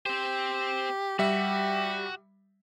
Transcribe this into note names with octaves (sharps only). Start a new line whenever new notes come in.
C4 G4 C5
G3 F#4 G4 E5